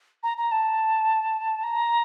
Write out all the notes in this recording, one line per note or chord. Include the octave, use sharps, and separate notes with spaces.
A#5
A#5
A5
A#5